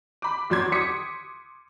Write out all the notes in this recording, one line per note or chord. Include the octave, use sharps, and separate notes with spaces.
B5 D6
E2 F#3 C6 D6 G#6
C6 D6 D#6 B6 C#7